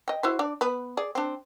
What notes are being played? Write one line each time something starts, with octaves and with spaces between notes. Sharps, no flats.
D#5 G5
E4 F#4 C5
D4 D5
B3 B4
G#4 D5
C4 D4